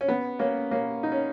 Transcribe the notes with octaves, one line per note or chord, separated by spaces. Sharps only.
C#4
B3
A#3 C#4
A#3 C#4
D#4
C#4